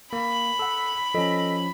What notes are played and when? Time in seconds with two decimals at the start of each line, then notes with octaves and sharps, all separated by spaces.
0.13 A#3 B5
0.59 A4 F#5 E6
1.14 F3 C#4 A4 D#5 B6